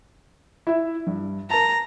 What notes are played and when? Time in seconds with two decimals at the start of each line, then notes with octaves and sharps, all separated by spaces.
0.67 E4 E5
1.07 G2
1.50 A#4 A5 A#5